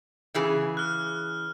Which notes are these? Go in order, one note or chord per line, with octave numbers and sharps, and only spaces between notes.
C#3 E3 G#4
F6 F#6